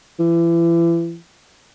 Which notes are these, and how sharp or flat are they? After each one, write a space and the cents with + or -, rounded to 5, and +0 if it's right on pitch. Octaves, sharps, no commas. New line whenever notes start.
E3 +35